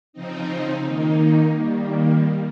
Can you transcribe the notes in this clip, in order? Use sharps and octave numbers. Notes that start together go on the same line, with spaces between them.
C#3 F3 C4 D#4
D#3 A#3 D#4
D#3 G3 A#3